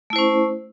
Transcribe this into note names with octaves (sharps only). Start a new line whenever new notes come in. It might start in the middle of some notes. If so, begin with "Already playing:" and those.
A3 C#4 E4 C5